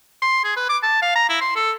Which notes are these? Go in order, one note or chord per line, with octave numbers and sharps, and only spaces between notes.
C6
G#4
B4
D6
A5
F5
A#5
E4
C6
A4